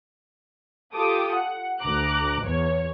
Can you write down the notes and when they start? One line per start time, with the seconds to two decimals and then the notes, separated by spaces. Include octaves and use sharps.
0.94 F4 G4 A4 D6 D#6
1.32 F#5
1.81 D2 A#5 D6 F#6
2.42 E2 C#5